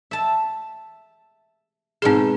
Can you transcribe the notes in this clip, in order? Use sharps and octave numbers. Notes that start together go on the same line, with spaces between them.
E5 A5
G#2 B2 C4 G#4 C6